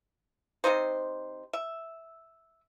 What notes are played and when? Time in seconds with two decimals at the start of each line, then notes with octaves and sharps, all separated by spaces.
0.64 C3 G3 D#4 C5
1.53 E5